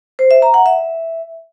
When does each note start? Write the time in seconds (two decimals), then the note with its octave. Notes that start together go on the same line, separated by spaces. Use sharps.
0.19 C5
0.31 E5
0.42 A#5
0.54 F#5
0.66 E5